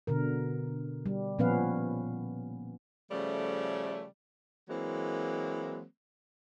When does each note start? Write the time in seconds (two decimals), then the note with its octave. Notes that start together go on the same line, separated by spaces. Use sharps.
0.07 B2 D3 A#4
1.06 G3
1.39 A#2 F3 B3 C#4 B4 F5
3.11 C#3 F3 G3 A3
4.68 E3 F#3 G#3 A#3 C4